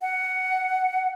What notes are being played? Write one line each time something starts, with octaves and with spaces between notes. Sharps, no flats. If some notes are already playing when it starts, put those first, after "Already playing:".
F#5